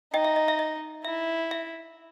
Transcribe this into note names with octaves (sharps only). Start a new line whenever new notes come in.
D#4 D#5 G5
E5
D#5
E5
D#5
E4 E5
E5